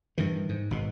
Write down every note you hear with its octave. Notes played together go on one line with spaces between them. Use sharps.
G2 D#3 E3
G#2
G#1 B2